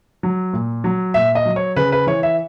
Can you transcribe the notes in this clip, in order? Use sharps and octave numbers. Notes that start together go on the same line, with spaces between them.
F#3
A#2
F#3
A#2 E5
D#5
F#3
C#5
C#3 B4
B4
E3 C#5
E5